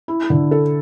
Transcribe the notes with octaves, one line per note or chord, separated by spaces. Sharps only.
E4
D3
A4